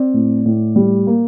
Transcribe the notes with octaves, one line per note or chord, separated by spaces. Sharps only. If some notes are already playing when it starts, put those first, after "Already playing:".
Already playing: C4 D5
A2
A2
G3
A#3